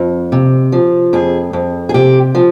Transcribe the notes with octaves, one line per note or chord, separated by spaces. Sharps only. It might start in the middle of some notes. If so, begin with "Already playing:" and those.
Already playing: F2
C3
F3
F2 G#4
F2
G#4
C3 G4
F3